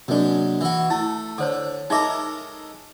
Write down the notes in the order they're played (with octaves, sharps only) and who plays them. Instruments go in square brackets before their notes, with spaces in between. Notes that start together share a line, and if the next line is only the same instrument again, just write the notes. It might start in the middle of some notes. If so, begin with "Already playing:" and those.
[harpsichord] F#2 G#3 [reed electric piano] C3 A#3 D4
[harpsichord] E3 F#4
[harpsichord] A3 [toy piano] E4 [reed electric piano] A5
[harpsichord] D3 [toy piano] A4 C5 C#5
[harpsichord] G#3 A4 A#4 [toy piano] D#4 E5 D6